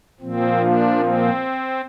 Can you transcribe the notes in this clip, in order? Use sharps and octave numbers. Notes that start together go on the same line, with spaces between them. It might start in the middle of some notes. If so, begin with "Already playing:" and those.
A#2 F3 C4
D4
C4